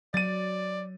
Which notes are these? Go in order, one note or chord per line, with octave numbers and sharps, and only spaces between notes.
F#3 D5 A6 D#7